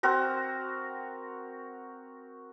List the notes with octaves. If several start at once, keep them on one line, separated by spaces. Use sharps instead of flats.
C4 F#4 A#4